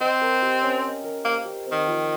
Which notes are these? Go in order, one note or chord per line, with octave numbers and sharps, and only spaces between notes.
C4 D#5
A#4
G4
C#4
D#5
A#4
A#3 C5
G4
C4
D#3
F3